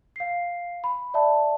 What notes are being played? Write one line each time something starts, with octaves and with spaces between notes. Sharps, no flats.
F5 C7
B5
D5 E5 A5